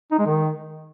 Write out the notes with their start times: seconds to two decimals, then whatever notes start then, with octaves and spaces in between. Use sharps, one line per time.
0.12 D#4
0.19 G#3
0.26 D#3